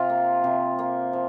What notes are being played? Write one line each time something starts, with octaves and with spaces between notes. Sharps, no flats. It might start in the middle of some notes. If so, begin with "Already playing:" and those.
Already playing: C3 F4
A#3
C3
A#3
F3